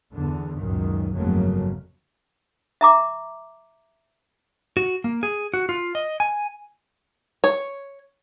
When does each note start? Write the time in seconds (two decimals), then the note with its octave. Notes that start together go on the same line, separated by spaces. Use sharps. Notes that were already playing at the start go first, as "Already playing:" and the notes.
0.13 E2 D3
0.58 C#2 F#2 A#2 D#3
1.14 G1 F2 C#3 F#3 A3 A#3
2.81 E5 A#5 D6
4.77 F#4
5.04 A#3
5.23 G#4
5.54 F#4
5.69 F4
5.95 D#5
6.20 G#5
7.44 C#5